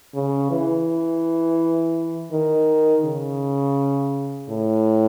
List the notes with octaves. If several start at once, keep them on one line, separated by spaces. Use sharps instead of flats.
C#3
E3
D#3
C#3
A2